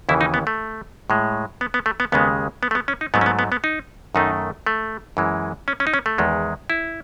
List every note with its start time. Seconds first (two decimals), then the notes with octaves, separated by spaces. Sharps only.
0.09 D#2 C#3 E3 E4
0.21 D#4
0.34 B3
0.47 A3
1.10 A2 G#3
1.61 B3
1.74 B3
1.86 A3
2.00 B3
2.12 D#2 C#3 G#3 B3
2.63 B3
2.71 A3
2.75 B3
2.88 C#4
3.01 D#4
3.14 G#2 F#3 A3 B3
3.21 C#4
3.26 B3
3.39 B3
3.52 B3
3.64 D#4
4.15 F#2 D#3 A3 D#4
4.67 A3
5.17 F#2 E3 G#3
5.68 C#4
5.80 C#4
5.87 D#4
5.94 C#4
6.06 A3
6.18 E2 D#3 G#3
6.70 E4